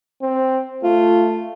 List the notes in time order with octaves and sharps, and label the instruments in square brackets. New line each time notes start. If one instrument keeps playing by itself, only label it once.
[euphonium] C4
[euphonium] A3 [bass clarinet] F4